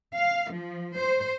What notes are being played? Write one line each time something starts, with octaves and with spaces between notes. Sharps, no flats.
F5
F3
C5